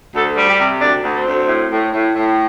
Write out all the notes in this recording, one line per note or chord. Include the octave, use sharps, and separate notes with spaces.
D2 A4
G3
G4
C3
D2 D4
D2
C4
D2
A2
A2
A2
A2